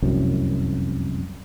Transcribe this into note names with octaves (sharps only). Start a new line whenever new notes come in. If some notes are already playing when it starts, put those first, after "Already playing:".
F1 C2 F#2 C3